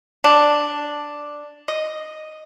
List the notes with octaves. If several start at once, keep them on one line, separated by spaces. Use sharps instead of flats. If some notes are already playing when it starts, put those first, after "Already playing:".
D4
D#5